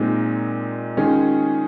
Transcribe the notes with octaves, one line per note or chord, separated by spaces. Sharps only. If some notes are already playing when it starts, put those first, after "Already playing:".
Already playing: A#2 G#3 C4 D#4 A#4
D#3 G#3 C#4 F4 G#4